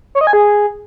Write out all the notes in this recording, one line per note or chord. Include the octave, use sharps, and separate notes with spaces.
C#5
D#5
G#5
G#4